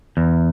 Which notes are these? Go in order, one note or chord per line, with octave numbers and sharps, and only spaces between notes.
E2